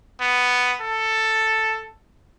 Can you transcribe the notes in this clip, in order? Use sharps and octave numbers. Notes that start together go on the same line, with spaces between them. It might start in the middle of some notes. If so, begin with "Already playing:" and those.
B3
A4